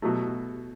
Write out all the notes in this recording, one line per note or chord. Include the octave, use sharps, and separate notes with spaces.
B2 F#3 A3